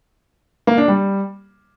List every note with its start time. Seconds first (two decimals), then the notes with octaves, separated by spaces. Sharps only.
0.67 A#3
0.78 D4
0.88 G3